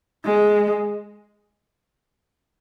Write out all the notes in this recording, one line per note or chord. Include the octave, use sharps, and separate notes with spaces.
G#3